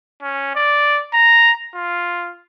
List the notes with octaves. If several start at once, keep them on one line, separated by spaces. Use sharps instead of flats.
C#4
D5
A#5
F4